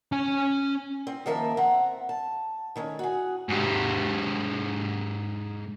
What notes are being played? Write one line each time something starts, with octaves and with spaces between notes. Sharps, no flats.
C#4 G#5
C4
D#3 F3 A#3 A#4 E5 A5
C4 E5 F#5 A#5
A5
D#3 A3 C#4
F#4 G#4
G#2 G4